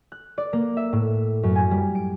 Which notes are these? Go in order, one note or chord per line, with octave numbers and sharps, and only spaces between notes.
F#6
D5
A#3
E5
A2
F#2
G#5
G3
D7